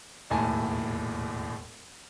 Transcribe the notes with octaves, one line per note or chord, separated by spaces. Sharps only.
E1 A#1 D#2 A2 G#5 A5